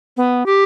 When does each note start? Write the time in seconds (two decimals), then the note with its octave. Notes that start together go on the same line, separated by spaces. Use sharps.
0.17 B3
0.46 G4